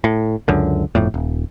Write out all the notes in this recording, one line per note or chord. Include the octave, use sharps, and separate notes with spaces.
A2
C#2 F#2 D3
G1 F2 A2
D#1